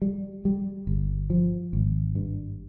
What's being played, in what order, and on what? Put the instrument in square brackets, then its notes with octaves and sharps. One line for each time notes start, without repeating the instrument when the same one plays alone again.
[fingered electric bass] G3
G3
G1
F3
G#1
G2